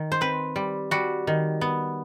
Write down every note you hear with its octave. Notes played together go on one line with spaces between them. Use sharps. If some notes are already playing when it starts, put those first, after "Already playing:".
Already playing: D#3
C5
C4 B4
G3
G3 F#4
D#3
B3